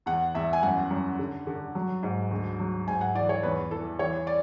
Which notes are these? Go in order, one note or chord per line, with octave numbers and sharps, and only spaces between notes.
E2 F#5
E2 E5
G#5
F#2 F#5
F#2
D3
D3
F#3
G#2
D2
F#3
G#2 G#5
F#5
E3 D5
C#5
E2 B4
E3 A4
E3 C#5
D5